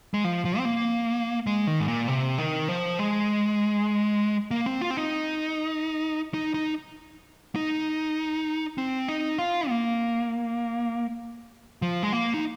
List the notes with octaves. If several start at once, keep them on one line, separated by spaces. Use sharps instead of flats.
G#3
F3
F3
C4
A#3
G#3
D#3
G#2
A#2
C3
D#3
F3
G#3
A#3
C4
F4
C4
D#4
D#4
D#4
D#4
C4
D#4
F4
A#3
F3
G#3
A#3
D#4